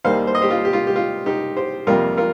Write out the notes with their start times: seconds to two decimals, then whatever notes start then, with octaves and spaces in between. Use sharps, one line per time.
0.04 D#2 D#3 G3 A#3 C5 F5
0.27 C5
0.35 D#5
0.42 G4 C5
0.50 F4
0.65 G4
0.73 F4
0.87 G4
0.96 F4
1.26 D#4 G4
1.57 G4 C5
1.87 F2 C3 G3 A#3 F4 A#4
2.17 F4 A#4